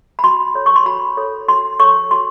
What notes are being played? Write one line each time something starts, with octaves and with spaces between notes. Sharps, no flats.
B5
F#4 C6
A4 C#5
C#6
C6
F#4 B5
A4 C#5
F#4 C6
A4 C#5 C#6
F#4 C6